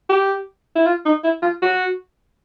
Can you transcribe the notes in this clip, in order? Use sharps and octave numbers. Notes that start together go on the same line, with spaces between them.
G4
E4
F4
D#4
E4
F4
F#4